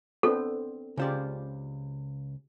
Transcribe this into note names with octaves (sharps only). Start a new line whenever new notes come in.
B3 C4 D4 A4
C#2 C#3 F4 G4 C5 D5